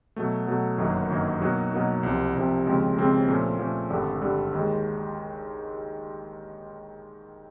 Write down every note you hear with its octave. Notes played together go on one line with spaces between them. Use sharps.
B2 F#3 A3
B2 F#3 A3
G1 F#2 D#3 F#3 A#3
G1 F#2 D#3 F#3 A#3
B2 F#3 A#3 D#4 F#4
B2 F#3 A#3 D#4 F#4
C2 C3 F3
C2 C3 F3
D#2 C#3 F3 G#3 C4
D#2 C#3 F3 G#3 C4
A#2 F3 A3 C#4
A#2 F3 A3 C#4
G#1 G2 D3 G3
G#1 G2 D3 G3
D#2 D#3 G#3